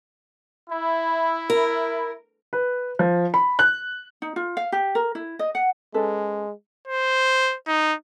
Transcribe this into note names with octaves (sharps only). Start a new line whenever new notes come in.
E4
A#4
B4
F3
B5
F#6
D#4
F4
F5
G4
A#4
E4
D#5
F#5
G#3 C#4 A4 B4
C5
D#4